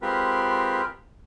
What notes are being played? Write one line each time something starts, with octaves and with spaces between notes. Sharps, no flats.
G#3 C4 F4 G4 A#4 B4